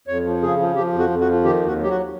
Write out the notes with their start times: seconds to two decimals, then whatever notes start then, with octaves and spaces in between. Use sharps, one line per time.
0.08 F2 C#5
0.24 F3
0.42 C#3 G#4
0.59 F3
0.76 F3 G4
0.93 F2
0.98 F#4
1.10 F2
1.21 F#4
1.28 F3
1.44 D#3 G4
1.61 D#2
1.67 F#4
1.78 F#3 G4
1.90 F#4